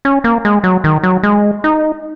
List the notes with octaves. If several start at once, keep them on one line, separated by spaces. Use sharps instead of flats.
C#4
A#3
G#3
F#3
D#3
F#3
G#3
D#4